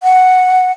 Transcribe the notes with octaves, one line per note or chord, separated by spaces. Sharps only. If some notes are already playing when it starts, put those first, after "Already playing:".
F#5